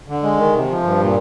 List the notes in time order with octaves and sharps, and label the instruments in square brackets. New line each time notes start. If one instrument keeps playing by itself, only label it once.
[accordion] D3
G#3
D#3
C3
F3
G2
A#2